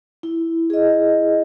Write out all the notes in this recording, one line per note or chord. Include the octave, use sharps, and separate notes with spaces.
E4
G#4 D#5